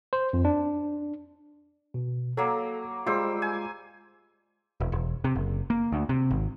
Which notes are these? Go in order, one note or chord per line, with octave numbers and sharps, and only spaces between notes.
C5
F2
D4
B2
F#3 A#3 A4
G3 G#3 F4 C5 E6
G#5
E1
E1
C3
F#1
A#3
D2
C3
G#1